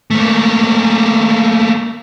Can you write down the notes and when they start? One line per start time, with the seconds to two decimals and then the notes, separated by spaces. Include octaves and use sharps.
0.11 A3 A#3